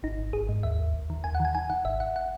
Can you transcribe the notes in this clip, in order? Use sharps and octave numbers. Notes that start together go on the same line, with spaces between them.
G#1 D#4
G#1
G#1 G#4
G#2
D#2 E5
D#2
D#2
D#3
D#2 G#5
F#5
D#3 G#5
D#3 G#5
D#3 F#5
G#1 E5
G#1 F#5
F#5